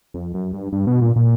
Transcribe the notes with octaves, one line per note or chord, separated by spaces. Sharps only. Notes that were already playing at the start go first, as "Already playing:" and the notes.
F2
F#2
G2
G2
B2
A#2
A#2